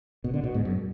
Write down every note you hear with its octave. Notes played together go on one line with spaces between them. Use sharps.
B2
D3
B2
G#2
F#2